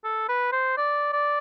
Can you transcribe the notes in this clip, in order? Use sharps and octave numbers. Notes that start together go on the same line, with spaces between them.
A4
B4
C5
D5
D5